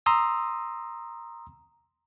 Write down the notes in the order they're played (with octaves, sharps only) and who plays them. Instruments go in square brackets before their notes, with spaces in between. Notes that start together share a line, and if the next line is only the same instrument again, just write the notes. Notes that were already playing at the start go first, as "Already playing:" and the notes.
[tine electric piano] A#5 C6 D#6 E6